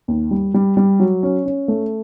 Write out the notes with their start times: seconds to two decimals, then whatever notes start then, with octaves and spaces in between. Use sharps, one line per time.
0.08 D#2
0.31 G3
0.54 G3
0.77 G3
1.00 F#3
1.23 C#4
1.46 C#4
1.68 A3